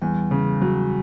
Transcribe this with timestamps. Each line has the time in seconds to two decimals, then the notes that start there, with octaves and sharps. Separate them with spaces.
0.02 E2 G3
0.31 C#3
0.62 F#3